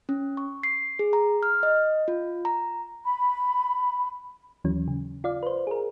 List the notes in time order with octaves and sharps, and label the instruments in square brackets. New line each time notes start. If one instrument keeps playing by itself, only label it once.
[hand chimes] C#4
C#6
C7
G#4
A#5
F6
D#5
F4
A#5
[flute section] B5
[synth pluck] D#2 E3 F#3 C#4
C#3
F4 D5 F5
B4 C5
G#4 A#4